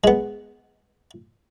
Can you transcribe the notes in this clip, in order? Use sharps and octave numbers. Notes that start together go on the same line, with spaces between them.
G#3 B3